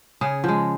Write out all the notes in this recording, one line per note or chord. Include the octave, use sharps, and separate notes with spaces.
C#3 G#4
F3 G#3